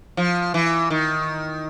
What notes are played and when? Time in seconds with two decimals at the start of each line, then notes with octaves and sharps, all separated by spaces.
0.17 F3
0.54 E3
0.90 D#3